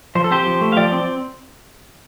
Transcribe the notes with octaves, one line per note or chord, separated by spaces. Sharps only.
F3 C5
A4
C4 G4 C5
F3
A3
F5
F3 D5 G5
C4